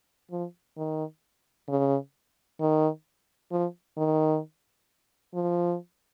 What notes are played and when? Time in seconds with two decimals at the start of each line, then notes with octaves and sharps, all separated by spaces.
0.31 F3
0.77 D#3
1.68 C#3
2.60 D#3
3.51 F3
3.97 D#3
5.34 F3